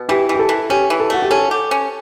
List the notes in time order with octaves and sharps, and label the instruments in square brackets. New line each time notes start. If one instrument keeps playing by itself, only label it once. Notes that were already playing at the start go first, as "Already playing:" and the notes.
Already playing: [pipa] B2
[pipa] E3 [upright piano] G4
[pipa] E3
[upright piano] G4
A4
[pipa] E3
[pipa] C#4 [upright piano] G4
[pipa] E3
[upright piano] A4
[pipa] A3 [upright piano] F#4
[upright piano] G4
[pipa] C#4 [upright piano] A4
[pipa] G4
C#4